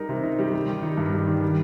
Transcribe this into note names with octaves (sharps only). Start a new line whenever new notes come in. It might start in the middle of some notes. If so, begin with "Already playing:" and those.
Already playing: G3 D#4 A#4
C3
D#4
G3
G3
D#3
D#4
G2
G3
D#3
G3